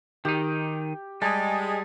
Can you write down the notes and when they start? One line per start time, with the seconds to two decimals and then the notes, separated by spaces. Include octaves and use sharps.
0.25 D#3 D#4 G4
1.22 G3 G#3 A5